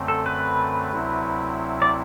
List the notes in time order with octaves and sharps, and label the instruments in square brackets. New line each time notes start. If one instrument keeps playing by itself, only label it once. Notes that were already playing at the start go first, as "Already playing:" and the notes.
Already playing: [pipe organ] F#2 D3 A3 C4
[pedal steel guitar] A4
B4
[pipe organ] D2 C3 F#3 C4 E4
[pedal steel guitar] D5